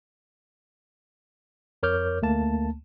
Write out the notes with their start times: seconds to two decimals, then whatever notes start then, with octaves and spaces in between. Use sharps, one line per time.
1.83 F2 A#4 C#5 D6 F6 G6
2.22 D2 A3 A#3 A5